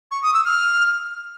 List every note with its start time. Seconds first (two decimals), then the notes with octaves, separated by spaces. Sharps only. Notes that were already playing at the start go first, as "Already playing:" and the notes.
0.11 C#6
0.23 D#6
0.34 E6
0.45 F6